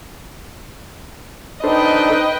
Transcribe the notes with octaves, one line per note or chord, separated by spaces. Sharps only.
D4 D#4 A4 B4 C5 D#5 G5